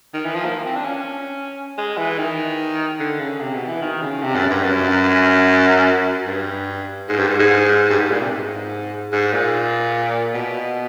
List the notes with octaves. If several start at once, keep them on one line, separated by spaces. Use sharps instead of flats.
D#3
E3
F3
A#3
C4
D4
C#4
G#3
E3
D#3
D3
C#3
C3
B2
E3
D#3
C#3
C3
F#2
G2
F#2
G2
G#2
G2
G#2
G#2
G2
G#2
A#2
C3
G#2
G#2
A#2
B2